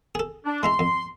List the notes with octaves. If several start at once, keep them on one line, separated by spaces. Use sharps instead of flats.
G#4 A4
D4
G#3 E4 A#5 C6
F2